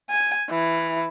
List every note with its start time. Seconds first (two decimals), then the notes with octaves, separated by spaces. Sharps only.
0.10 G#5
0.50 E3